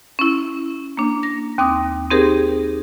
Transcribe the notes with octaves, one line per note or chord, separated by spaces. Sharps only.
C#4 E4
A#3 D4
A#6
D#2 C4 D6 D#6
C4 D#4 G4 G#4 A#4 C5